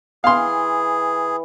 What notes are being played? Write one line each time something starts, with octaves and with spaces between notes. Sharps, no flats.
E3 G#4 F5 G5 C6